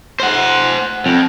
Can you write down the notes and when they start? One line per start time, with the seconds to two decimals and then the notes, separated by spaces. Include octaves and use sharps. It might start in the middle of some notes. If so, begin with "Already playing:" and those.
0.20 C5 F#5
1.06 F2